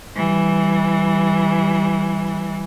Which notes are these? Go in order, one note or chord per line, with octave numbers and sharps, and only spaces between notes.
E3 G3